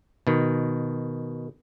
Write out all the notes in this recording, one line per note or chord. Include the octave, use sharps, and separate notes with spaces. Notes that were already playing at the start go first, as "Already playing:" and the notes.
B2 D#3